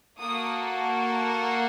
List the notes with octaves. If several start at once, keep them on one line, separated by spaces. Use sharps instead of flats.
A#3 F#4 A4 D#6